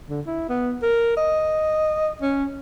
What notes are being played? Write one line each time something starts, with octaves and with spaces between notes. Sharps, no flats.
D3
E4
B3
A#4
D#5
C#4